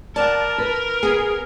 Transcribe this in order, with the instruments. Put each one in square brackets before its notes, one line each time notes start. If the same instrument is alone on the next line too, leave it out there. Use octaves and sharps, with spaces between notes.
[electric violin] A#4 [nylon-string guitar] D5 F#5 [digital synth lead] A5
[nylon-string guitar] B4
[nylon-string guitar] B3 [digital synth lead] G#4